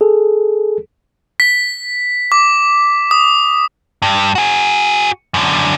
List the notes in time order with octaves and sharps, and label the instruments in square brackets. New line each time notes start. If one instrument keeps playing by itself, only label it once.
[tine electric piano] G#4 A4
[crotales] B6
D6
D#6
[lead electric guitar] G2
F#4 G#4
F#2 D3